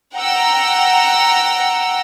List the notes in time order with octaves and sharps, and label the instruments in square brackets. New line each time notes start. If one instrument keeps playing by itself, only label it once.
[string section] F#5 G5 A#5 E6